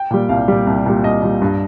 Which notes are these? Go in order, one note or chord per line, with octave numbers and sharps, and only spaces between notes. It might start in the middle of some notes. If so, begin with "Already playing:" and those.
Already playing: G5
A#2 G3
C2 F5
A#2 G3
C2
A#2 G3
C2 D#5
A#2 G3
G2